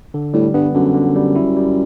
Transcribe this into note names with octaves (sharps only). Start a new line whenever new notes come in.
D3
A2 G3
G2 B3
F#2 D3
D3
G3
E4
G3